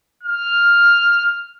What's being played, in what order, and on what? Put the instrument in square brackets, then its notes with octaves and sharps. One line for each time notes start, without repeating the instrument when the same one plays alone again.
[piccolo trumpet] F6